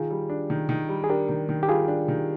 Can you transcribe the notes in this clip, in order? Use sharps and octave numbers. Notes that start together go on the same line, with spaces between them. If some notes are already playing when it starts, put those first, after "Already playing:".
Already playing: D#3 F4 G#4
G3
D4
D#3
D#3
G3
G#4
D4 G4 A#4
D#3
D#3
G4
G3 F4 G#4
D4
D#3